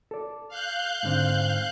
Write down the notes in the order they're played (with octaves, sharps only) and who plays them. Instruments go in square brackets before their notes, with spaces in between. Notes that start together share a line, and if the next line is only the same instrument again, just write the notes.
[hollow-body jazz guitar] A4 D5
[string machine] F5 F#6 G6
[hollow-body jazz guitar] G#2 D3 C4